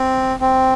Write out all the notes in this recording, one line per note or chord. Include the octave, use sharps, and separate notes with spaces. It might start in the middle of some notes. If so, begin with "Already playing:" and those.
Already playing: C4
C4